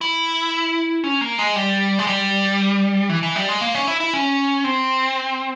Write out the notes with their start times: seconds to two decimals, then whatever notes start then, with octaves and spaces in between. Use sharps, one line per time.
0.01 E4
1.04 C#4
1.21 A#3
1.39 G#3
1.56 G3
1.99 G#3
2.07 G3
3.09 E3
3.23 E3
3.36 G3
3.49 G#3
3.61 A#3
3.75 C#4
3.87 E4
4.00 E4
4.13 C#4
4.64 C4